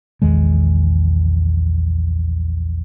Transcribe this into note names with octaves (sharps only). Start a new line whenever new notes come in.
A#1 E2 D#3 G#3